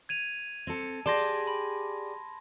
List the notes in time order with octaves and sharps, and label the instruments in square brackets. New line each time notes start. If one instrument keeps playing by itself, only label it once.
[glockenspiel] G#6 D#7 F7
[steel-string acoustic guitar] C4 A4
[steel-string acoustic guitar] G4 G#4 D5 [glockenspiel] A5 C6 A#6
[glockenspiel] B5